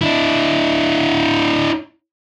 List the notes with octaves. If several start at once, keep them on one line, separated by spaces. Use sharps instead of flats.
D4 E4